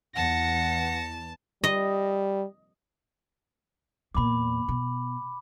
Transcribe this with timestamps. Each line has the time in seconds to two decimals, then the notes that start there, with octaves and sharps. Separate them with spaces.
0.16 E2 E3 F#5 A5 A#6 C#7
1.64 G3 D#5
4.15 E2 A#2 B5 D6
4.69 B2